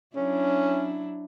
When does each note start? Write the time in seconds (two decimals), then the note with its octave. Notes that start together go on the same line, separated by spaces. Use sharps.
0.16 F#3 C#4 D4 E4